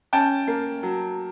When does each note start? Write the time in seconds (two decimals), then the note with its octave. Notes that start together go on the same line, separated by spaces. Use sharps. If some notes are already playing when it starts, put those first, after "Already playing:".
0.13 C#4 G5 A5
0.48 A#3
0.83 F#3